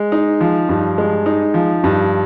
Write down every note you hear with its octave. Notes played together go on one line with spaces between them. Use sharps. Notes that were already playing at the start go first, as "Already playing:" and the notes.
Already playing: G#3
D#4
F3
G2
G#3
D#4
F3
G2